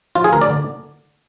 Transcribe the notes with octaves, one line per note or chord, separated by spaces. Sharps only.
F3 F4
G#4
D2 A#4
D5
D3